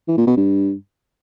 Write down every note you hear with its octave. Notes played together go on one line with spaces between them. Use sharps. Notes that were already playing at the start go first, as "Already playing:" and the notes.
E3
A#2
B2
G2